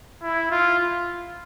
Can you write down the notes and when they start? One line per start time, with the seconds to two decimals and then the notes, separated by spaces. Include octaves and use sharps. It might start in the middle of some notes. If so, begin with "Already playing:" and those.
0.23 E4
0.51 F4